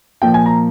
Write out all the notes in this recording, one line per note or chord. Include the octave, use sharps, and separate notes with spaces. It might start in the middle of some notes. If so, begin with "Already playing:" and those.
A#2 F3 A#3 G5
G#5
A#5